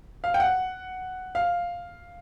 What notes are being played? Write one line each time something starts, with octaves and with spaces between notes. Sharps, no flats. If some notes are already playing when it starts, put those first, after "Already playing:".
F5
G5
F#5
F5